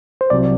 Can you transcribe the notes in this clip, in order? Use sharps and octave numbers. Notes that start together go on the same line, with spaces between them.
C5
C2 C3 F#3 D5